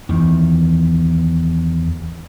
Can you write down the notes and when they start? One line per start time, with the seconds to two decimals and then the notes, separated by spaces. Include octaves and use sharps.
0.09 E2 D#3